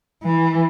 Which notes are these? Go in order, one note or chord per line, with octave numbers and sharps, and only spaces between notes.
E3